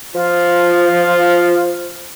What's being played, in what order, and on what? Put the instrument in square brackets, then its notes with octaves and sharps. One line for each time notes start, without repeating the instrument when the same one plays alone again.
[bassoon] F3 [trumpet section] F4